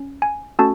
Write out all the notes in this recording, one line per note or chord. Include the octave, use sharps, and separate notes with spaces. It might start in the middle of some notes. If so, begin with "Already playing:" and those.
Already playing: C#4
G#5
A3 C#4 F#4 A4 A5